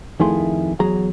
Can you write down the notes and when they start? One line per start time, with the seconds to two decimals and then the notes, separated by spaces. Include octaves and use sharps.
0.20 F2 D#3 A3 E4 G#4 C6
0.80 E2 F#3 G#4 A#5